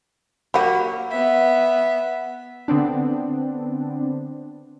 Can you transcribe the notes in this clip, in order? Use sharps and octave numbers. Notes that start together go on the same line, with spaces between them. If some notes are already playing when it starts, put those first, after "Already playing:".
F#3 A#3 G4 F#5 B5
B3 E5
D3 B3 C4 D4